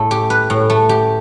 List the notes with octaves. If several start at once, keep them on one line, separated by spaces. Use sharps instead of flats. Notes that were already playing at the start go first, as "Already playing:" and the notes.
Already playing: A2 A3
G4
B4
A2
A3
G4